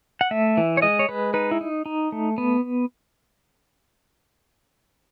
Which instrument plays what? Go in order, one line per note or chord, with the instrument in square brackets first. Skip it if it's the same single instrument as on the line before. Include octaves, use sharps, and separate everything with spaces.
[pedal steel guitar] F#5
A3 E5
E3
C#5
G#3 D#5
C#5
G#3 B4
D#4 B4
E4
D#4
D#4
A3
B3